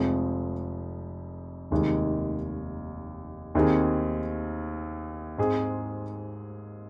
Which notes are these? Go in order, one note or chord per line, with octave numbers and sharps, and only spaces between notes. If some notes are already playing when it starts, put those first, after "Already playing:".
Already playing: F1 F2 F3 G#3
F1 D#2 D#3 G#3
D#2 D#3 C4 G#4
G#2 G#3 C4 G#4